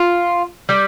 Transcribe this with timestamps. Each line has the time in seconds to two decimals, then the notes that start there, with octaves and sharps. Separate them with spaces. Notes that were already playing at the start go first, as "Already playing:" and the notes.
Already playing: F4
0.69 G3